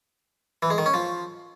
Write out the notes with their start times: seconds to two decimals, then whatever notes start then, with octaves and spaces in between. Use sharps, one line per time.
0.63 E3
0.70 G#3
0.78 D#3
0.86 C#4
0.94 F3